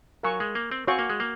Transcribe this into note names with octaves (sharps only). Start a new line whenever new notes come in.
F#3 A#4 F5 G#5 C#6
G#3
A#3
C4
C4 F#4 C#5 F5 G#5 C#6
A#3
G#3
A#3